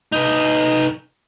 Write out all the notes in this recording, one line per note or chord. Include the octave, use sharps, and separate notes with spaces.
D#4 B4